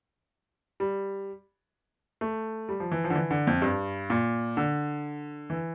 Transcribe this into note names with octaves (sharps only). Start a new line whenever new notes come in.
G3
A3
G3
F3
E3
F3
D3
E3
D3
F2
G2
A#2
D3
E3